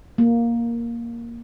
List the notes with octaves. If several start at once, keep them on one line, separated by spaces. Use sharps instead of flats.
A#3